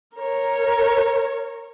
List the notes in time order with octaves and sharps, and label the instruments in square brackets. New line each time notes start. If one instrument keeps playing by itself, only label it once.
[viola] A#4 C#5